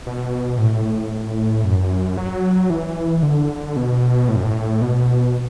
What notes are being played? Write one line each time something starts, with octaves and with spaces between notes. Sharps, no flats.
B2
A2
F#2
F#3
E3
D3
B2
A2
F#2
A2
B2